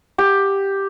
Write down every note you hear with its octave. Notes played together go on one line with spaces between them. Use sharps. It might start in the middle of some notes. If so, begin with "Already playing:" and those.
G4